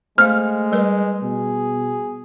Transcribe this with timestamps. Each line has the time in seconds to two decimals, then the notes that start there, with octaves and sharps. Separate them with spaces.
0.18 G#3 A3 C5 F5 F6
0.72 G3 A#4 B4
1.23 B2 G#4